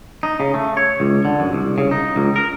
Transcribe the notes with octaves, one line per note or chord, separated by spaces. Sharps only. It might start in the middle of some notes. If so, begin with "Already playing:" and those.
D#4
C#3
A3
C#5
C#2
D3
F#2
C2
C#3
D#4
C#2
A#4